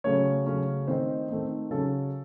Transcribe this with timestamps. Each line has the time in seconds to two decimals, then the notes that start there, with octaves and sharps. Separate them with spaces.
0.04 C#3 F#3 A3 C#4 C#5
0.46 C#3 F#3 A3 C#4
0.87 D#3 A3 C4 D#4 C5
1.29 D#3 A3 C4 D#4
1.71 C#3 F#3 C#4 A4